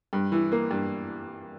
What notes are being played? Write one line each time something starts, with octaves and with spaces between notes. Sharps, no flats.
G2
E3
A#3
G2